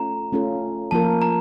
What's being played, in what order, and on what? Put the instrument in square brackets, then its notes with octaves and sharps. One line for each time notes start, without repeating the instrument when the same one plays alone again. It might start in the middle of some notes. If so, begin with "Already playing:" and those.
Already playing: [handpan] A3 C#4 F4 A4 [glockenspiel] A#5
[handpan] A3 C#4 F4 A4
[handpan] F3 A#3 F4 A#4 [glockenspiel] A5
[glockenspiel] A#5